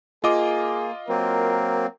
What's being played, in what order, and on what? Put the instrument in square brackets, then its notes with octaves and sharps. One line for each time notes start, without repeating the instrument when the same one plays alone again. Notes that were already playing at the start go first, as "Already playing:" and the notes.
[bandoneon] A#3 [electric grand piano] F4 D#5 D6 [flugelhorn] G#4
[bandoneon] F#3 A#3 C4 [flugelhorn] A#4